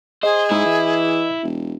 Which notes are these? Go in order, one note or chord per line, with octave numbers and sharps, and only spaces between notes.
G#4 C5 D#5
G#2 E4
E3
E1